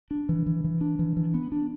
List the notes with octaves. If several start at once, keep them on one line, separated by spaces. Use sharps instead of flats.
D4
E3
E3
E3
D4
E3
E3
B3
D4